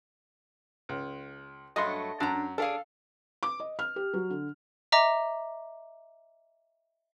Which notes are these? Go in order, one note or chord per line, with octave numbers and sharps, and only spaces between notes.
C#2
G2 F#3 A3 D#5 C6
F#2 D4 A#5
D4 G#4 A4 F5
D6
D#5
F6
G4
F#3
D3
D#5 E5 A#5 D6